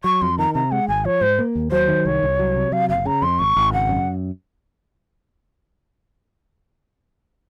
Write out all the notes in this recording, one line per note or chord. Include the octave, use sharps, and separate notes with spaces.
F#3 C#6
F2 C6
D#3 A#5
C3 A#5
G#3 F#5
G#1 G#5
F3 C#5
G#2 C5
A#3
D#2
F#3 C5
D#3
C2 C#5
C2
F#3
C3
F#3 F5
F#1 F5
C#3 A#5
F2 C6
G#1 C#6
G#1
C#3 F#5
F#2